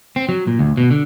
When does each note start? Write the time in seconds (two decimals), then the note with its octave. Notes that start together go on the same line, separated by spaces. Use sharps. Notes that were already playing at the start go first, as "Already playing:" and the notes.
0.16 C4
0.29 F#3
0.47 A#2
0.59 D2
0.77 B2
0.91 D3